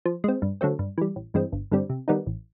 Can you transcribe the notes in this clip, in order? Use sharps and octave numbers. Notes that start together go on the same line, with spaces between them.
F3
G#3 C4
G2
D3 F#3 A3 C4
G2
E3 G3
A1
G2 E3 G#3 C4
G1
G2 D3 G3 C4
C3
D#3 G3 B3 D#4
A1